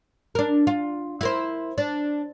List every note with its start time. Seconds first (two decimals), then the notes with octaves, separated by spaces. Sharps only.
0.35 D4 A#4
0.67 F4
1.21 E4 A#4 C5
1.78 D4